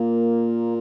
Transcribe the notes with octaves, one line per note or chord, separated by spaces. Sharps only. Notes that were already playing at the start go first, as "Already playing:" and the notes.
Already playing: A#2 A#3